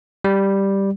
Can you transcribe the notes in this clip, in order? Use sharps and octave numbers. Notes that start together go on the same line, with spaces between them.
G3